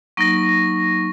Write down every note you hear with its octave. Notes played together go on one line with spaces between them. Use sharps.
F#3 A#3 D#4 C#6 A#6